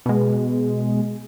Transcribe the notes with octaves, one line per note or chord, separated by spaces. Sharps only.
B2 G#3